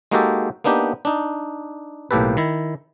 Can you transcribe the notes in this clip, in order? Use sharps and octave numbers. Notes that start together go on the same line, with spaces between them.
G#3 A#3 D#4 F#4 G4 A4
A#3 B3 D4 D#4 G4
D4 D#4
B1 A2 A#3 G4 A4 B4
D#3 E4